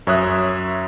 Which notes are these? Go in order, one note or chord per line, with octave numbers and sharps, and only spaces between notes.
F#2 C#5 E5 D#6 F#6